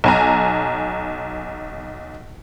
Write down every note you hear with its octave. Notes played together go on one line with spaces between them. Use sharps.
B1 G#5 A#5